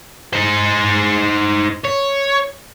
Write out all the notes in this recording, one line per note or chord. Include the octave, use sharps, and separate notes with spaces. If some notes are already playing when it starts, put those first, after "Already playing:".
D#4 C5
C#5